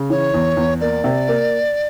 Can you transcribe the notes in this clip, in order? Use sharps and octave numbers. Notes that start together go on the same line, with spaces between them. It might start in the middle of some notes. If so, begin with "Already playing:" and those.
Already playing: C#3
E3 C#5
E2
E2
A#3 D5
C3
A#3